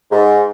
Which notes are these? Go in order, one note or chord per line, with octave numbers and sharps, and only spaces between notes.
G#2